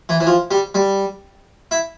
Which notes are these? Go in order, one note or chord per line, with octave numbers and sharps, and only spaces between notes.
E3
E3
F3
G3
G3
E4